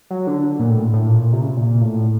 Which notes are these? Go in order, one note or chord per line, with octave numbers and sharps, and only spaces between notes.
F#3
D3
A#2
A2
A2
A#2
C3
C#3
C3
A#2
A2